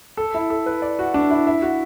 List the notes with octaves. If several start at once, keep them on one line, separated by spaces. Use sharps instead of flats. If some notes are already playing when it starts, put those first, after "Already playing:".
A4
E4
A4
B4
D5
F#4
D4
E4
E4
F#4